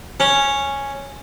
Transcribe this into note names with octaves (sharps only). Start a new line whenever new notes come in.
C#4